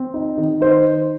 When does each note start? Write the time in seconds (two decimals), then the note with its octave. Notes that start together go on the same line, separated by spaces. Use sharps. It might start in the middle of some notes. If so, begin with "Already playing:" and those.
Already playing: C4
0.14 D#4
0.38 D#3
0.61 D#4 C5